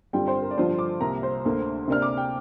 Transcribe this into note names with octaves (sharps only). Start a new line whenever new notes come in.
G2 D3 G3 C4 F4 G5
C5
A#4
D5
G2 D3 F3 D4 F4 C5
D6
C2 C3 A#3 A#5
C5
D2 D3 A#3
C3 A#3 D4 F6
D6
G5